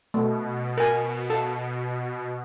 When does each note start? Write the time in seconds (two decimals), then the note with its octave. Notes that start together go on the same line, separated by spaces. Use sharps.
0.14 B2 A3
0.78 A#4 G#5
1.30 A4 A5